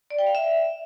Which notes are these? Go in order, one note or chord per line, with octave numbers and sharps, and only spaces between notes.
D5
G5
F5
E5